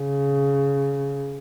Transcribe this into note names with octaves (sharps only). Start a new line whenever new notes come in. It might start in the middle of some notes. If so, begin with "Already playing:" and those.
Already playing: C#3